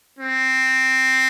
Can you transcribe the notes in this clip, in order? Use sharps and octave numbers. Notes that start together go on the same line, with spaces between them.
C4